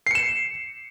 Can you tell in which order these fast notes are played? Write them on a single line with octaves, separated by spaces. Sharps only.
C7 C#7 E7